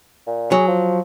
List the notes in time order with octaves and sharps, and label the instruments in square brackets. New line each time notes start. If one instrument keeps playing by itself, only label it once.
[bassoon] A#2
[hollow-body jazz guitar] F#3 [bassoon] G#4
[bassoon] F3